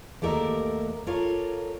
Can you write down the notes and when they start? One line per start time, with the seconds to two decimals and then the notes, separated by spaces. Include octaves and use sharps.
0.22 D#2 A3 G4 A#4 D5 E5
1.07 F4 A4 A#4 C#5 D5 F5